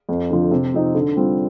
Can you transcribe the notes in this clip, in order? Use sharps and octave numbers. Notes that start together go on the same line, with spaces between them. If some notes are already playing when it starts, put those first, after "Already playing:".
F2
D3 F3
C3
F3 C4 D#4
D3
G3 C4 F4